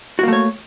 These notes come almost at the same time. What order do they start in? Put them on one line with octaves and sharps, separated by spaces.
F#4 A#3 A3 C#5